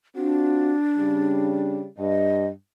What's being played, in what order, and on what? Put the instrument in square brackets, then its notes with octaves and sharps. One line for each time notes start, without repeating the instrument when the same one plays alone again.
[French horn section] C4 F4 F#4 [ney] D4
[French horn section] C#3 G3
[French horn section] G2 [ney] D#5